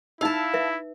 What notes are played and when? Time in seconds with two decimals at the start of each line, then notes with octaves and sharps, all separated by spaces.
0.21 D#4 E4 F5 A5 E6
0.54 B4 E5